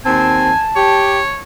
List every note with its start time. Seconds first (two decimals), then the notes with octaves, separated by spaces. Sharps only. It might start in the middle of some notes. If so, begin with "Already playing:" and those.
0.05 D#2 C4 G#5 A5
0.76 G4 C#5